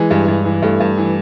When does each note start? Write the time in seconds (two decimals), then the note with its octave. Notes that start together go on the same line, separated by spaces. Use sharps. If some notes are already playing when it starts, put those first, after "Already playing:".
Already playing: E3 G#3
0.11 G2
0.28 G2
0.45 E3
0.62 G2 A3
0.80 G2
0.97 E3